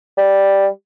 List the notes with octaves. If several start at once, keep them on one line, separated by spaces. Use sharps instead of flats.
G3